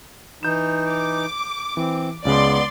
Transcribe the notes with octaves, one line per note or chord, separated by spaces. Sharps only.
E3 D#4 G6 E7
D6
E3 C4
C#2 C#3 G#3 B3 D5 C6